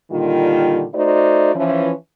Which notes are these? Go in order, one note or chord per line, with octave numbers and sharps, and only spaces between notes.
A#2 D3 D#3 G3 F4
A3 D#4 F#4 C5 D5
E3 F3 C#4